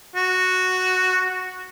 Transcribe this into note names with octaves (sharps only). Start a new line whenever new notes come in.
F#4